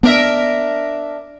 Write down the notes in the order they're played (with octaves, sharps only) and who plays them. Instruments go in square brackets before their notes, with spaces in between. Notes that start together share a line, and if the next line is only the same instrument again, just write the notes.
[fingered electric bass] B3 [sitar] D4 A#4 E5